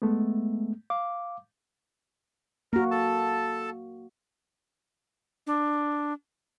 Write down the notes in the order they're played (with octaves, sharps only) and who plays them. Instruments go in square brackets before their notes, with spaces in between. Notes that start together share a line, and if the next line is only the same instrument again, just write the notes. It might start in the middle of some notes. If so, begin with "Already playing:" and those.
[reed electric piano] G#3 A3 B3
F5 D6
[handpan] A#3 F#4 [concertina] A#4
[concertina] A4 A5
[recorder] D4